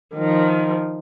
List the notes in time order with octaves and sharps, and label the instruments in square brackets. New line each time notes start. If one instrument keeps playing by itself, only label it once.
[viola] D#3 F3